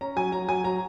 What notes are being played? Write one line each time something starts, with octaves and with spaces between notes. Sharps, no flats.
C#4 A#5
F#3 G#5
F#3 A#5
F#3 G#5
F#3 A#5